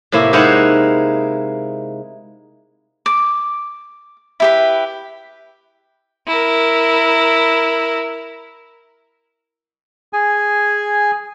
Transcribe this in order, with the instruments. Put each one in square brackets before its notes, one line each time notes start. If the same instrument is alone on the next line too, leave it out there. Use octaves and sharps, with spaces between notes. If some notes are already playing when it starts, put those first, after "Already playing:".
[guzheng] A2 C3 A#3 E4
G#3 D#4 E4 C5 F5 F#5
[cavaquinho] D6
E4 G4 B4
[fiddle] E4 A#4
[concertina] G#4 G#5